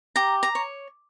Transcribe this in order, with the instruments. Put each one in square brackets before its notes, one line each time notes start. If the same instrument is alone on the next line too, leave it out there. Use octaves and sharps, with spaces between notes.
[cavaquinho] G4 A#5
A#5
C#5